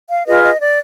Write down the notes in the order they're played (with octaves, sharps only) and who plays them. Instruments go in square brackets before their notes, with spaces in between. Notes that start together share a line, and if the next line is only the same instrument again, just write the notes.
[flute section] F5
F4 G#4 B4 D#5
D#5
D5